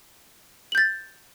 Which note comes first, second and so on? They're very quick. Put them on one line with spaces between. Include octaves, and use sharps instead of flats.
F#7 G6 A6